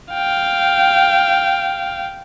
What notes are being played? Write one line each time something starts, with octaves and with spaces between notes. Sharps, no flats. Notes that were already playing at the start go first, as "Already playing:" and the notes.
F5 G5